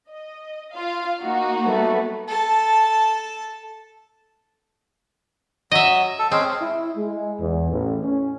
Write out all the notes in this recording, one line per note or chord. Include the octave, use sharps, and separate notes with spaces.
D#5
F4 F5
A#3 D#4 F#4
G3 A3 B3
A4 A5
F#3 D#5 E5
A4
G#3 C4 C#4 G#4
E4
G#3
E2
A1
C#4